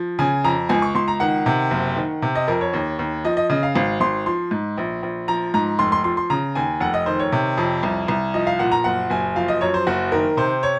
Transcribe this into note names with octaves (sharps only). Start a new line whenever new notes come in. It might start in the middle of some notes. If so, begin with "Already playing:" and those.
Already playing: F3
C#3 G#5
F2 A#5
C#2 G#5
C#6
C#2 C6
A#5
D#3 F#5
C3
F#1
D#3
C3
D#5
F2 A#4
C#5
D#2
D#2
F3 D#5
D#5
C#3 D#5
F5
G#1 F5
G#1 C6
F3 C6
G#2
A#1
A#1
F3 A#5
G#2 A#5
F1 C6
C6
F3 C6
C6
C#3 A#5
D#2 G#5
F1 F#5
D#5
D#3 C5
C#5
C3
F2
C2
C2
F3 D#5
F5
A#2 F#5
A#5
F#1 F#5
F#1 G#5
F3 F5
D#5
F#2 C#5
C5
F#1 F#4
D#3 A#4
C3 C5
C#5